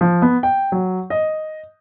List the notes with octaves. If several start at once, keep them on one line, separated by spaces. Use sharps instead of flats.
F3
B3
G5
F#3
D#5